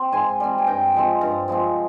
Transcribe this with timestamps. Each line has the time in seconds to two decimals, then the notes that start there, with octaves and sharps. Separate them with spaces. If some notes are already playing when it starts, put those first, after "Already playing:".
Already playing: C4
0.12 G#2 G#5 C6
0.40 G3 C4
0.58 G#5
0.67 G2 G5 A#5
0.94 F3 G#3 C4
1.21 G2
1.48 F3 G#3 C4